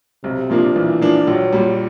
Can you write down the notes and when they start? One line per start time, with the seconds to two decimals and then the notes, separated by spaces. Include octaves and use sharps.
0.24 B1 C3
0.50 A#2 F3 A#3 D4
0.75 B1 E3
1.01 A#2 F3 A#3 D4
1.27 A#1 F#3
1.53 A#2 G3